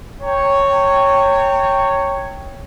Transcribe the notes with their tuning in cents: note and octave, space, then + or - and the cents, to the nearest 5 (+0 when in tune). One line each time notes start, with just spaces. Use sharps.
C#5 +0 G5 +0 A#5 -40